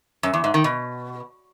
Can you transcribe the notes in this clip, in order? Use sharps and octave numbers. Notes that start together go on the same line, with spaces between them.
F#2
E2
G#2
D#3
B2